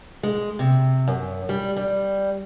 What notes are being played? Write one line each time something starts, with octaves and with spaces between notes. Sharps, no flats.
G#3
C3
F#2
G3
G3